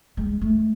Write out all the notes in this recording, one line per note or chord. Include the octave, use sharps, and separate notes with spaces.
G#3
A3